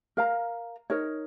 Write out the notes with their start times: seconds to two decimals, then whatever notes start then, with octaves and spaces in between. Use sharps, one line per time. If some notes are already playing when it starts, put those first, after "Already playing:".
0.17 A#4 F5 A#5
0.90 D#4 A#4 C#5